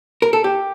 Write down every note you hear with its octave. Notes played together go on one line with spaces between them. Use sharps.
A#4
A4
G4